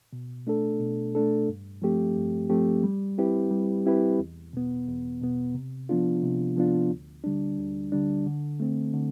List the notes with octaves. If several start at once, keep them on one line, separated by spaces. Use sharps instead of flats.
B2
A3 D4 A4
B2
A3 D4 A4
G2
F3 A3 C4 G4
G2
F3 A3 C4 G4
G3
C4 E4 G4 B4
G3
C4 E4 G4 B4
E2
B2 B3
E2
B2 B3
C3
F3 B3 D4 F4
C3
F3 B3 D4 F4
D2
D3 G3 D4
D2
D3 G3 D4
D3
A3 C4
D3